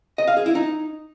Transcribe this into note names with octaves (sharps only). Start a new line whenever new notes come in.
D#5
F5
G#4
E4
D#4